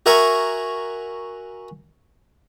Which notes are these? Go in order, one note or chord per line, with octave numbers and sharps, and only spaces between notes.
F#4 A#4 E5 G#5 A#5 C#6